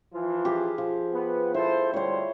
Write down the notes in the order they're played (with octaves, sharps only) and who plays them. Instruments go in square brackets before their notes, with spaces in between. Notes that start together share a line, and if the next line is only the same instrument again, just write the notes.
[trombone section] E3 F3 F4
[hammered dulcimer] G4 G#4
F3
[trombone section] B3
[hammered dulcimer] E4 [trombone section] A4 C5
[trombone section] D2 G3 [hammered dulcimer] C5 C#5